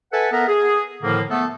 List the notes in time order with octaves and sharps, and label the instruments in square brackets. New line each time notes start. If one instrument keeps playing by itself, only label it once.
[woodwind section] A4 B4 E5 F#5 G#5 A5
B3 A4 A#4 E5 F#5 A#5
G#4
A2 D3 D#3 F3 A#3
A3 B3 A4